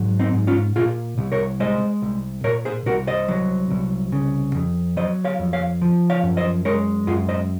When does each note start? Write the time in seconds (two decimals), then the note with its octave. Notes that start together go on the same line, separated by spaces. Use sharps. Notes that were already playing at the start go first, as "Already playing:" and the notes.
Already playing: G#2 F#3
0.19 C4 D#4
0.33 G#2
0.47 C#4 F4
0.76 A#2 F4 G#4
1.18 C2
1.32 A#4 C#5
1.60 G#3 C5 D#5
2.02 C2
2.44 A#2 A#4 C#5
2.65 G#4 C5
2.86 C2 F#4 A#4
3.07 C5 D#5
3.28 F#3
3.70 C2
4.12 C#3
4.55 F2
4.97 F#3 C5 D#5
5.25 C#5 F5
5.39 F2
5.53 C#5 F5
5.82 F3
6.10 C#5 F5
6.23 F#2
6.37 C5 D#5
6.65 G#3 A#4 C#5
7.07 F#2 F4 G#4
7.29 C5 D#5